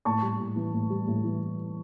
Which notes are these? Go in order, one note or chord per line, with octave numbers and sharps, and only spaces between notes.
A2 A5 C#6
G3
A2
E3
A2
G3
A2
E3